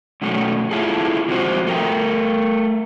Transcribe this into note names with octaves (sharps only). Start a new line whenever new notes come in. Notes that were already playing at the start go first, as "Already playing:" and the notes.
F#2 B2 F#3 A3 C#4
E4 F4 G#4 A4
C3 F3 G#3 B3 F#4 C5
A3 A#4 G5